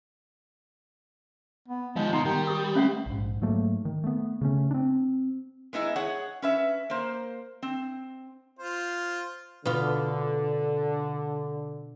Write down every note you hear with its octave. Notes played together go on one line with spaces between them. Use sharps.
B3
D#3 F3 G#3 F5
B2 D#4 F#5 A#5 C6
D#3 G3
G4 D#6
A3 C#4 F5 F#5
A#1 G#2
G#2 F#3 A3 A#3
D#3
A3 B3
C#3 A3 C#4
C4 D4
G#3 B3 D#4 E4
G#4 C#5 F#5
C#4 B4 E5
A#3 C5
C4
F4 C5
B2 D3 F4